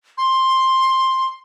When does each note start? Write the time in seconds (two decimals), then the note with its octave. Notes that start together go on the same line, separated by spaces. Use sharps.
0.18 C6